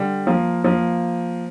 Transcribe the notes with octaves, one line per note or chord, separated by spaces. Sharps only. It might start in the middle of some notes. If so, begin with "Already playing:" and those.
Already playing: D3 G3
F3 A#3
F3 A#3